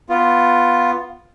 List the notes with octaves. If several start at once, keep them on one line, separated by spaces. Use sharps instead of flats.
B3 F4